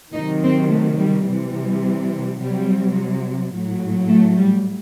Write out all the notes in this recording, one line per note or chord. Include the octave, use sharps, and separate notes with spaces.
C3 D#3 F#3 D#4
C4
A3
G3
C3 E3 G3
C3 F#3 G3
A2 F#3
A3
G3